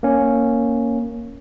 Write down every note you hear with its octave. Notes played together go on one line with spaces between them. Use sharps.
A#3 C#4